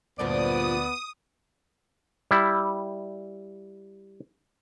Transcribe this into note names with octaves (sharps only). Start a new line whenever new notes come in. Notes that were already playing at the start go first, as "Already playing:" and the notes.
D2 G2 A#2 F3 B3 D5 D#6
G3 E4